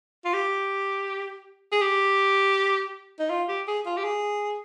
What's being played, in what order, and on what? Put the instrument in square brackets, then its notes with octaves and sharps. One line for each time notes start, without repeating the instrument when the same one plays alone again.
[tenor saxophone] F4
G4
G#4
G4
D#4
F4
G4
G#4
F4
G4
G#4